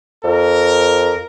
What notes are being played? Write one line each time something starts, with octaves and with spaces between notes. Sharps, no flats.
F2 A#4